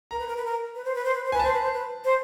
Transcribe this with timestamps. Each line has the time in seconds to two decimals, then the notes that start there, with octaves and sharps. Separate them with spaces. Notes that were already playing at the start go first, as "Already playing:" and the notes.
0.11 A#4 A#5
0.19 B4
0.27 A#4
0.37 B4
0.45 A#4
0.75 B4
0.85 C5
0.95 B4
1.05 C5
1.15 B4
1.24 C5
1.32 B4 G#5
1.39 C5 A5
1.53 B4
1.62 C5
1.73 B4
2.04 C5